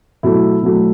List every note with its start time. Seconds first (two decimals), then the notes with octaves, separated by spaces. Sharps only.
0.23 B2 F#3 A3 E4
0.62 B2 F#3 A3